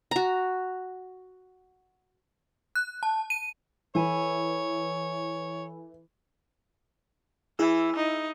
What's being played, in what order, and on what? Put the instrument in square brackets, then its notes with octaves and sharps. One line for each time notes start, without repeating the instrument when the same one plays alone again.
[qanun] F#4 A#5
[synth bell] F#6
A5
D#7
[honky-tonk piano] E3 [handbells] A4 G#5 B5 [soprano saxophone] C#5
[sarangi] E3 [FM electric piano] E4 G#4 E6
[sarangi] D#4